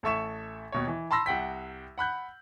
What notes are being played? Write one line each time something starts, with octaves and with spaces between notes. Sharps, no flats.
A1 A4 E5 C#6 E7
D#2 B2 C#5
E3
A5 B5 C6 E6 A#6
C2 F#5 G5 B6
F#5 B5 F#6 G6